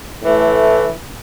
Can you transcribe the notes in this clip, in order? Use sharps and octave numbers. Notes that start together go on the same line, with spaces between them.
A2 E3 A3